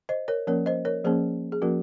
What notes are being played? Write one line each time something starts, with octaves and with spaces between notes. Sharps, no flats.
C5 D#5
A#4 C#5
F3 A#3 C#4 A#4 C#5
C5 D#5
A#4 C#5
F3 A#3 C#4 G#4 C5
G#4
F3 A#3 C#4 F#4 A#4